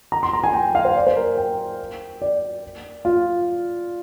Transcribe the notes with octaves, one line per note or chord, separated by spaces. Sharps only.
A#5
C6
A#5
G#5
G5
F5
C5
D5
C5
A#4
G5
D5
F4